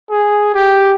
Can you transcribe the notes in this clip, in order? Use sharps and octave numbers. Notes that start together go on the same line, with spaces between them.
G#4
G4